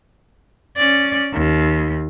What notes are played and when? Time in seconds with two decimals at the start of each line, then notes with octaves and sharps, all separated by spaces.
0.77 C#4 D5
1.33 D#2